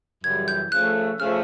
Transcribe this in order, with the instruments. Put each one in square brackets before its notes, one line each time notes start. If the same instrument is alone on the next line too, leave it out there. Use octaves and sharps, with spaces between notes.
[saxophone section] F#2 C#3 E3 G3 [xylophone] G#6
[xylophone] G6
[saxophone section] C#3 F3 A3 [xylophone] F#6
[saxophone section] C#3 F3 A3 [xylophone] F6